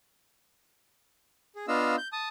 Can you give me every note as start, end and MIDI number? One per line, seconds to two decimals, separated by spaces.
1.55 1.66 68
1.68 1.96 59
1.68 1.96 62
1.68 1.96 65
1.68 1.96 75
1.68 1.96 77
1.68 1.96 88
1.98 2.08 91
2.13 2.29 81
2.13 2.29 87